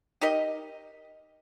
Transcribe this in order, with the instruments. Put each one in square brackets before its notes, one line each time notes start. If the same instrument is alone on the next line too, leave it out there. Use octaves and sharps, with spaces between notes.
[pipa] D#4 G4 A#4 D#5